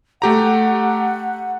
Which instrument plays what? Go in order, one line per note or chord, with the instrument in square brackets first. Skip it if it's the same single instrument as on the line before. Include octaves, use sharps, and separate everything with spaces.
[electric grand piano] A3 G4 A#5 [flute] F#5